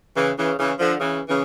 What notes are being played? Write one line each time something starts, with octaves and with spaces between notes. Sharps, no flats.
C#3 E3
C#3 E3
C#3 E3
D3 F3
C#3 E3
C#3 E3